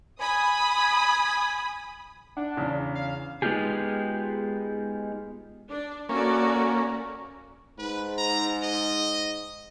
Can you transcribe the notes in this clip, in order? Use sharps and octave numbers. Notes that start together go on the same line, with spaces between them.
G#5 B5 D#6
D4 F#5
E2 C#3
F5
G#3 B3 D#4 F4 G4 G#4
D4
A#3 C#4 F#4 A4 D5
G#2 B4
A#5
D#5